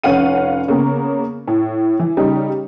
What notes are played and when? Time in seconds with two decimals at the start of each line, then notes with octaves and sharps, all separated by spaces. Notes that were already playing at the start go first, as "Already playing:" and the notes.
0.04 F1 C#4 F5 F#5 D#7
0.68 C#3 A#3 B3
1.48 A2
1.99 E3
2.17 C#3 G3 D#4